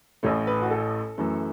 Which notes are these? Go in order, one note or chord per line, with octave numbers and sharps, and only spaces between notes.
A1 A2 A3 C#5
B4
F#4
A4
F#2 E3 A3